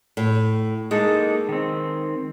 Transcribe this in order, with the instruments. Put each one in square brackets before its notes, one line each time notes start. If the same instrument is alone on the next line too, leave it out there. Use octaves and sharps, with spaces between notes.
[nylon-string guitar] A2
[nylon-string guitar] G#3 [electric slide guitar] A#3 D#4 A4
[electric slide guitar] D#3 C4